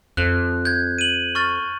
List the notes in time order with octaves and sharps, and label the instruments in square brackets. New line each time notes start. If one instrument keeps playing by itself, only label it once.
[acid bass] F2 [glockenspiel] F#6
[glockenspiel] G6 G#6
D#7 F#7
C#6 F6 A6